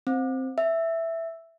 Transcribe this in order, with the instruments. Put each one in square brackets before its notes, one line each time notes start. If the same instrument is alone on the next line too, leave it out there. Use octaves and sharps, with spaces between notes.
[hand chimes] C4
E5